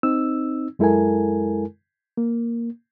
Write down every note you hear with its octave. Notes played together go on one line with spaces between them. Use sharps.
C4 D#4 E6
F#2 G#3 E4 A4 A#4 G#5
A#3